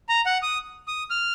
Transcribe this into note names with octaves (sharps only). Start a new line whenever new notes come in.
A#5
F#5
D#6
D#6
F6